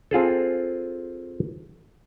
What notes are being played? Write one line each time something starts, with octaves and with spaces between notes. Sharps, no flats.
C4 F4 G#4 A4